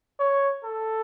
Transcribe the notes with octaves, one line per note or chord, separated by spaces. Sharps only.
C#5
A4